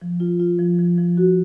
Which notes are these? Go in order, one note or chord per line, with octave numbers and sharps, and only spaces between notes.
F3
F4
F4
F3
F3
F3
F#4